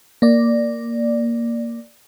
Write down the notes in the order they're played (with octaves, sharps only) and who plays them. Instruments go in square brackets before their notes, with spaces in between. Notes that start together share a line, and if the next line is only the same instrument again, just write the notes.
[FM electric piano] A#3 D5